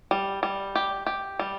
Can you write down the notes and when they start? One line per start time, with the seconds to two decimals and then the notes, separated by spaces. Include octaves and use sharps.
0.11 G3
0.43 G3
0.75 G4
1.06 G4
1.39 G3